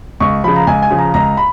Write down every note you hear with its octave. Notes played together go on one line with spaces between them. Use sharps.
C#2 C#6
C#3 F3 B5
A#5
C#2 G#5
G#5
C#3 F3
A#5
C#2 A#5
B5